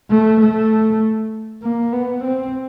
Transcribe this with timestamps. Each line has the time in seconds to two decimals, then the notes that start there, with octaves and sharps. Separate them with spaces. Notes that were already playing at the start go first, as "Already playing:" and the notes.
0.10 A3
0.41 A3
1.62 A#3
1.92 B3
2.24 C4